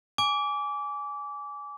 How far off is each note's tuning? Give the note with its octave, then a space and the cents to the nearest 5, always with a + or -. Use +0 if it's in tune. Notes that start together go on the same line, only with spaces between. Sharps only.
G#5 +0 D6 -25